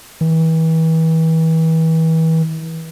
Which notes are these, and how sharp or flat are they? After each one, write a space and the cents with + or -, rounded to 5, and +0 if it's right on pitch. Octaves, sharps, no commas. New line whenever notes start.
E3 -35